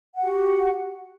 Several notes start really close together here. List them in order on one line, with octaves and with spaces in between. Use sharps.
F#5 G4 F#4